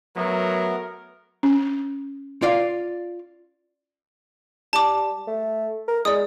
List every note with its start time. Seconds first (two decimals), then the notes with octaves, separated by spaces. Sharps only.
0.16 F#3 A3 B3 A#4
1.43 C#4
2.42 F4 D5 F5
4.73 G3 A5 D6
5.27 A3
5.88 A#4
6.05 G#3 D5 D#6